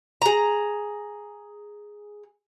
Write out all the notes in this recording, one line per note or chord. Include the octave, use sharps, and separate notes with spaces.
G#4 A#5